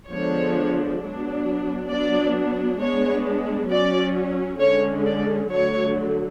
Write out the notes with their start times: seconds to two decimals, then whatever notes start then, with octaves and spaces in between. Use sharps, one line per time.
0.12 D3 F3 G#3 B3 D4 C#5
1.02 F#3 B3 D4
1.91 F#3 B3 D4 D5
2.81 G#3 B3 D4 C#5
3.70 F#3 C#4 D5
4.61 D3 G#3 C#4 C#5
5.06 D5
5.50 D3 F#3 A3 C#5